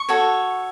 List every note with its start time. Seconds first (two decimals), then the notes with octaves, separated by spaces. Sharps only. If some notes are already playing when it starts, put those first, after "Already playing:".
Already playing: C#6
0.09 F#4 A4 C#5